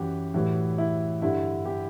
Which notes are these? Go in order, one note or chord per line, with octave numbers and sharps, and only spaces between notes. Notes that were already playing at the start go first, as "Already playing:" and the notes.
Already playing: F#2 E3 G3 F#4 G4
A2 E3 G3 F#4
E4
G2 D3 G3 E4
G4